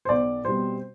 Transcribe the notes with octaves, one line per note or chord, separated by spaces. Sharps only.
C5
B1 D5
B2 G3 C4 C5